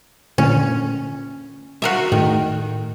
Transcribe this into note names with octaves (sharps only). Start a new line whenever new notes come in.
A#2 D3 C#4
F#4 A#4 E5
A2 D#3